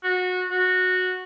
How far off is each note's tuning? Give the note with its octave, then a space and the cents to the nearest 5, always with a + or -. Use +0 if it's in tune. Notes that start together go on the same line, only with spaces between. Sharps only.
F#4 -20
F#4 -10